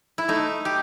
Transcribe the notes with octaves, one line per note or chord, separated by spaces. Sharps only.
E4
A3 D#4
G4